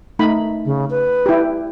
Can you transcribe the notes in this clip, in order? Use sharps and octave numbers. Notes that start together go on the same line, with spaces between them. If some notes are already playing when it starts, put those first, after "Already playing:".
A3 D#4 B5
C#3
B4
E4 G4